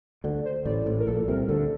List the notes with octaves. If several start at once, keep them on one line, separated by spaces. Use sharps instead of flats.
D2 D3
C5
A1 A2 D5
A1 A2
A#4
A#1 A#2 A4
C2 C3 A#4
D2 D3 A4